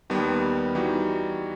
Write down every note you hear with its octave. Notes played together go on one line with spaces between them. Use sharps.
D#2 D#3 G3 B3
E3 G3 D#4 F#4